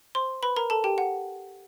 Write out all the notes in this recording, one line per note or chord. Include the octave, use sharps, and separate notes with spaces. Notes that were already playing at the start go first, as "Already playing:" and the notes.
C5 C6
B4 B5
A#4 A#5
A4 A5
G4 G5
F#5